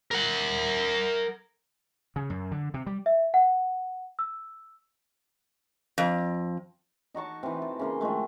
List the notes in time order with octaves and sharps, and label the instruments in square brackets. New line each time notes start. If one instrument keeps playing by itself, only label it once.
[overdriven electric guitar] A#4 F#5
[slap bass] C#3
F#2
D3
C3
G3
[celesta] E5
F#5
E6
[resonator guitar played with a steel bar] F2
[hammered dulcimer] D#4 F#4 A5 C#6
C3 E3
A4
C#3 A#3 C6
D#3 F3 G#3 A3